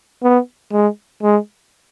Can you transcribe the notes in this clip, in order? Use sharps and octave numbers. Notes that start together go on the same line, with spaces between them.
B3
G#3
G#3